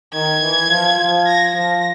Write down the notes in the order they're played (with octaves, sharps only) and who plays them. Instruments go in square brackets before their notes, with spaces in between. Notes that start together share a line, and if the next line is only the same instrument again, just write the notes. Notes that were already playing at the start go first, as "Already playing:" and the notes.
[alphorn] D#3 [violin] G#6
[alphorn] E3
F3
F3
[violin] A#6
[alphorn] F3 [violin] A#6